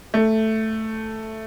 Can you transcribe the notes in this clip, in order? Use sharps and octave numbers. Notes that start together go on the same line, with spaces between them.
A3